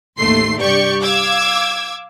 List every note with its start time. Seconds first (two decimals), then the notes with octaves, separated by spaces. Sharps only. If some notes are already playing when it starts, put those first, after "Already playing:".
0.18 A1 D#2 A3 C6 C7
0.58 G2 C3 G4 D5 C#6 G6
1.02 F5 D6 E6 G#6